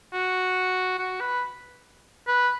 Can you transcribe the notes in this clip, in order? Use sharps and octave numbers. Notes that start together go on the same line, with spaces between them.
F#4
F#4
B4
B4